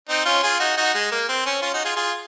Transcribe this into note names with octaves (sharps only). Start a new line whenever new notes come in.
C4 D#4
C#4 F4
F4 G#4
D#4 F#4
D#4 F#4
G#3
A#3
C4
C#4
C#4 F4
D#4 F#4
F4 G#4
F4 G#4